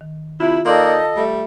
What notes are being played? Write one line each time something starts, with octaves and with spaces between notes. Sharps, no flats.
D#3
C3 E4 F4
A#3 D#4 A4 D5 D#5 F5 C6 D6
G3 A3